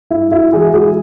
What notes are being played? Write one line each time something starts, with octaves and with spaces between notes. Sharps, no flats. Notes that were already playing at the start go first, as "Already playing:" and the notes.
G2 E4
E4 F#4
E3 G#3 F#4 G#4
F#4 G#4